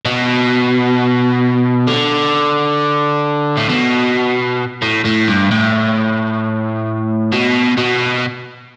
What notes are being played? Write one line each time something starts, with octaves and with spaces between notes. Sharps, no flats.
B2
D3
A2
B2
A2
A2
G2
A2
B2
B2